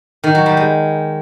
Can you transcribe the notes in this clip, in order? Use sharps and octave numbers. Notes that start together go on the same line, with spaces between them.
D#3
F#3
G3
G#3